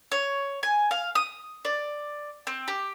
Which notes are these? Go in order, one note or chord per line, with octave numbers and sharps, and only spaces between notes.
C#5
G#5
F5
D#6
D5
C4
G4